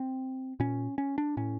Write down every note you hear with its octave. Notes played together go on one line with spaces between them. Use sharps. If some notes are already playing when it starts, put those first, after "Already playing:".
Already playing: C4
A#2 C#4
C#4
D4
A2 C#4